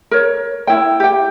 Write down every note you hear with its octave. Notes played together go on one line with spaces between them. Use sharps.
A#4 C#5
E4 G5
G4 G5